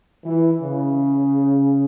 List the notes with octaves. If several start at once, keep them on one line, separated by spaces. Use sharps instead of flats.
E3
C#3